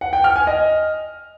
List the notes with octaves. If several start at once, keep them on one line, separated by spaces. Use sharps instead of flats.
F#5
G5
F6
G#5
D#5